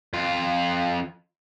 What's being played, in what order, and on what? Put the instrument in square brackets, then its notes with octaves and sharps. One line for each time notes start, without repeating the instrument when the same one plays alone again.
[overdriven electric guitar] F2 F4